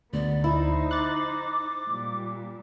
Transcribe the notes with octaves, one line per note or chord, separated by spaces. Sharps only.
D2 B3 D5
D#4 E4 C5
D6 F#6 A6
A#2 G3